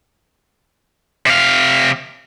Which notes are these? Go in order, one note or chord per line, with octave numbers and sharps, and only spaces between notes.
C3 F5